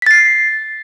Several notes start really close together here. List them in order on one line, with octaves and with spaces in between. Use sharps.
B6 A6 C7